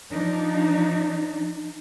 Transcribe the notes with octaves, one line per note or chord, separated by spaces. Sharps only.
F3 D4 D#4